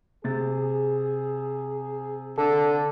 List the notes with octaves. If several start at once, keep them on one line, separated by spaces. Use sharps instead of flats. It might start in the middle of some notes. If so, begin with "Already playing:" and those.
C3 G#4 A6
D3 A4